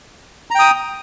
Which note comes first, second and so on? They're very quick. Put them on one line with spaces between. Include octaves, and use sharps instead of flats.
A#5 G5 D#6